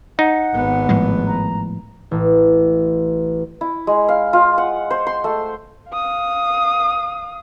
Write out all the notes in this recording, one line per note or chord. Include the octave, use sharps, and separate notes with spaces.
D#4 F#5
G#1 B3
A2 F3 G#3
A#5
A1
E4
G#3
F5
F4
F#5
C5
C6
A3
F5 D#6